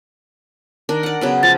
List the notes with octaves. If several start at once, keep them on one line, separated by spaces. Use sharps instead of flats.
D#3 D4 A#4
D5 F#5
C#3 F#3 B3
F3 A6